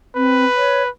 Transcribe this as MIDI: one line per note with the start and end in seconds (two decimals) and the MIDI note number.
0.16 0.45 60
0.16 0.89 71
0.56 0.83 73